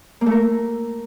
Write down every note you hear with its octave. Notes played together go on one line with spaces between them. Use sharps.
A#3
A3
A#4